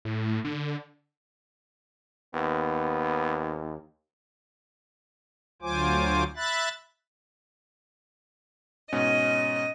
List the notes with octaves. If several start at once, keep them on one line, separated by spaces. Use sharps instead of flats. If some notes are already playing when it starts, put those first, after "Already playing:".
A2
D3
D#2 B3
D2 F#3 F4 C5 G#5 D6
E5 B5 F#6 A6
G#2 B2 C#4 D#5